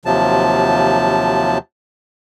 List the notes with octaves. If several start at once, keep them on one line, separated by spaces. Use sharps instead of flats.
D#2 C3 F3 F#3 A5